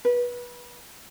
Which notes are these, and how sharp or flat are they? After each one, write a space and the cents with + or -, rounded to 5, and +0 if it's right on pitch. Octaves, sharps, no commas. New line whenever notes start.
B4 -25